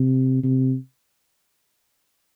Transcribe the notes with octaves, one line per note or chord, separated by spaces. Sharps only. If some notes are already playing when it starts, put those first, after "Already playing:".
Already playing: C3
C3